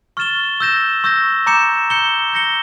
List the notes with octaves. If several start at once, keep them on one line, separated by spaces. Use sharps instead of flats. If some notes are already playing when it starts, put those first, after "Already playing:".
C#6 F6 A6 E7 G7
E6 G6 A#6 E7
C#6 E6 G6 A#6
A#5 D6 G6 C#7 E7
G6 C#7 E7 G7
G6 A#6 C#7 G7